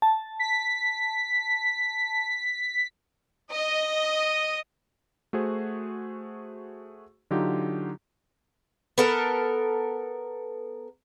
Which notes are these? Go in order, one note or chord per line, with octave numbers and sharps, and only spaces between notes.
A5
B6
D#5
A3 F#4 G#4 C5
D3 F#3 D#4 F4 G4
B3 A4 A#4